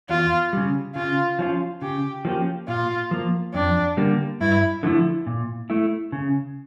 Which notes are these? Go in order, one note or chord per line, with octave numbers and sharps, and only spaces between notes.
E2 F4
C#3 G3
C#3 F4
F3 C#4 F4
C#3 G4
F3 A#3 C#4 G4
A#2 F4
F3 A#3
F2 D4
D3 G3 A#3
G2 E4
D3 F3 A3 E4
A#2
A3 E4
C#3